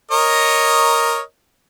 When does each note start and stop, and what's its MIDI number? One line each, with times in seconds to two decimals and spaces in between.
0.12 1.20 70
0.12 1.20 73
0.12 1.20 75